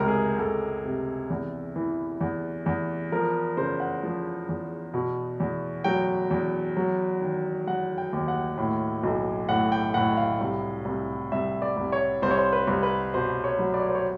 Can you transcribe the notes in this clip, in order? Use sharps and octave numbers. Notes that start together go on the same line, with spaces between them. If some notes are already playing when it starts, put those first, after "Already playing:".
Already playing: C#2 C3 A#4
G#4
C#2 A4
C3
E2
E3
E2
E2
F3 A#4
C#3 C5
F#5
F3
E2
B2
E2
F#3 G5
E2
F#3
D#3
F#3 F#5
G5
D#2
F#5
A2
B1
A2 F#5
G5
A2 F#5
F5
C2
C2
C2 E5
D5
C2
C#5
C2 C5
C#5
C5
B4
C2
B4
B2 C5
C#5
F#3
D5
C#5
C5
C#5